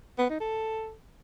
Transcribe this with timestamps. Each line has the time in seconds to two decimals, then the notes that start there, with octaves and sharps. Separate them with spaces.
0.19 B3
0.30 D#4
0.41 A4